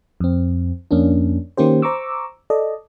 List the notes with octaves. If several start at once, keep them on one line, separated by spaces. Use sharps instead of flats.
F2 C4
F2 A#3 C#4 D4
D#3 A#3 C#4 G4 C5
C5 A#5 C#6 D6 E6
A4 D5 D#5